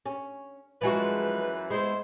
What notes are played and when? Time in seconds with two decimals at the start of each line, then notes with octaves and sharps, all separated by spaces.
0.06 C#4
0.81 F#2 E3 F3 G#3 F#4 B4
1.70 G#3 B3 E4 C5